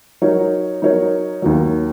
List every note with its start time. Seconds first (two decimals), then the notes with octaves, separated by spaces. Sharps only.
0.22 F#3 D#4 A#4 C#5
0.82 F#3 D#4 A#4 C#5
1.42 D#2 D#3 F#3